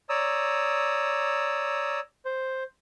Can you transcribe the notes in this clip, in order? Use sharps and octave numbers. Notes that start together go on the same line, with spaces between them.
C#5 D5 A#5 D#6 E6
C5